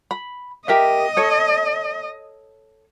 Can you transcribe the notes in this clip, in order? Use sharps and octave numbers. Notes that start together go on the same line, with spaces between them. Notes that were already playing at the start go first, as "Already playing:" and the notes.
B5
G4 A#4 D#5 E5
A4 C#5